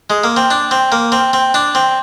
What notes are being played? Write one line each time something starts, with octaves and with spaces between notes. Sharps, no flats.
G#3
A#3
C4
D4
C4
A#3
C4
C4
D4
C4